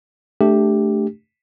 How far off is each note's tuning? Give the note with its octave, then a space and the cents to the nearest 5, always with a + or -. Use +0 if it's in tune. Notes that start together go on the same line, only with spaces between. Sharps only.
A3 -10 D4 +0 G4 +5